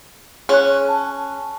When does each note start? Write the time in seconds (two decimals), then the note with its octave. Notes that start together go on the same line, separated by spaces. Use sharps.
0.49 C#4 G#4 C#6 F#6
0.89 A5